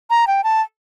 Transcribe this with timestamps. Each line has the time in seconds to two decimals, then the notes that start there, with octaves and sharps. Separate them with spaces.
0.10 A#5
0.27 G5
0.44 A5